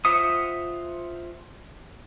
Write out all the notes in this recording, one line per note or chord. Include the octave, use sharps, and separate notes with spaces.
F4 C5 E5 F#5 D#6